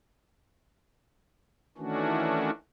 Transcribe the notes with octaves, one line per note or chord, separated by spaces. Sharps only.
D#3 E3 A3 C#4 D4 F#4